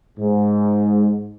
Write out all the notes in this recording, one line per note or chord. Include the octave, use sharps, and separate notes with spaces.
G#2